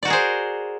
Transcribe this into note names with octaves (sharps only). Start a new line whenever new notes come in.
F#4 G#4 A#4 C5 D5